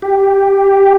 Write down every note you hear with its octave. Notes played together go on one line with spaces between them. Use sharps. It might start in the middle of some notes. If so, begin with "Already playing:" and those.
G4